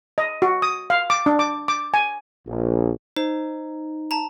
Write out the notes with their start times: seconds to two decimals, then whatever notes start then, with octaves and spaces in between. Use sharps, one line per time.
0.18 D#5
0.42 F#4
0.62 D#6
0.90 F5
1.10 D6
1.26 D4
1.39 D6
1.68 D6
1.94 G#5
2.47 A#1
3.17 D#4 C5
4.11 A5 A#5